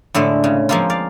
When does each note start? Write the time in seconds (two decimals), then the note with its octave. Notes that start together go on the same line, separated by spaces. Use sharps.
0.14 A2 D3 G#3 A3
0.44 C#3
0.69 F3 G#3 A#3 C4 F4
0.90 D5 F5